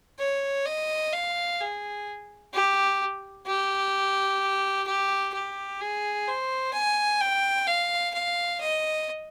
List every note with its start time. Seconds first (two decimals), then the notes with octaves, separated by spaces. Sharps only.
0.19 C#5
0.66 D#5
1.12 F5
1.60 G#4
2.54 G4
3.46 G4
4.87 G4
5.34 G4
5.81 G#4
6.27 C5
6.73 G#5
7.21 G5
7.67 F5
8.14 F5
8.60 D#5